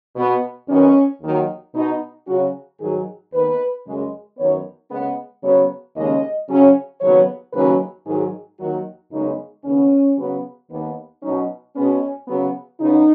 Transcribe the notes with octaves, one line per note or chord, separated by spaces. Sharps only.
B2 B3
F#2 D#3 B3 C#4
D#2 D#3 F#3
B2 B3 D#4
C#3 F#3 C#4 F#4
G#2 D#3 F#3 G#4
D#2 D#3 B3 B4
F#2 C#3 G#3
F#2 D#3 B3 C#5
C#3 G#3 B3
C#3 F#3 B3 C#5
D#2 C#3 G#3 C#4 D#5
C#3 F#3 C#4
D#2 C#3 F#3 B3 C#5
D#2 C#3 F#3 C#4 B4
G#2 D#3 F#3 G#4
D#2 D#3 F#3 F#4
F#2 C#3 G#3 B3 D#4
D#2 C#3 B3 C#4
C#3 F#3 B3
D#2 D#3 B3
B2 F#3 C#4 D#4
B2 G#3 B3 C#4
C#3 F#3 B3
C#3 B3 D#4